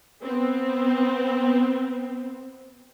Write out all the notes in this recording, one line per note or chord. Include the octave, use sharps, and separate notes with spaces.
B3 C4